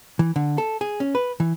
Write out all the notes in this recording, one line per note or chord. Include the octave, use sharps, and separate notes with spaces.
E3
D3
A4
G#4
C#4
B4
E3